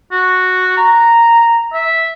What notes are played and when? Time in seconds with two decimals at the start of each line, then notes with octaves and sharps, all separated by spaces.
0.12 F#4
0.77 A#5
1.73 E5